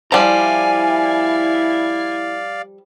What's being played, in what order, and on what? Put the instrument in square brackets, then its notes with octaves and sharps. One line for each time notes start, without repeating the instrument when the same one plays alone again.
[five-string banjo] F3 G3 [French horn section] E4 [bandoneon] D5 F5 [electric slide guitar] G#5 A#5